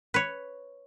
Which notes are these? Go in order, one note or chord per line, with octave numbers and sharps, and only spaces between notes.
B4 C#5